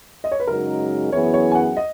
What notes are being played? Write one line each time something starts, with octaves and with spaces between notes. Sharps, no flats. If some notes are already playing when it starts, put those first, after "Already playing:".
D#5
C#5
B4
F#2 C#3 G#3 D#4 F#4 A#4
F#2 E3 B3 E4 G#4 C#5
C#5
G#5
F#5
D#5